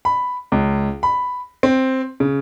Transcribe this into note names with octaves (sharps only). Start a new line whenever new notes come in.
B5
C#2
B5
C4
C#3